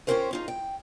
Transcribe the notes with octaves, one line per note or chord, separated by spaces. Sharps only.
C#4 D4 F4 G4 A#4 C5
D#4 F4 G#4
G5